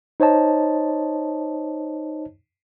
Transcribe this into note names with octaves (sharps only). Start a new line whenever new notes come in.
D#4 C5 C#5 D#5 A5